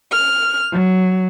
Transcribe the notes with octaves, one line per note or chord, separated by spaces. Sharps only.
F6
F#3